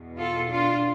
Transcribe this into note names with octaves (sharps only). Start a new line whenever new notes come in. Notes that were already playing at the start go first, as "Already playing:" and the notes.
Already playing: E2 B2
F4 A4
D4 F4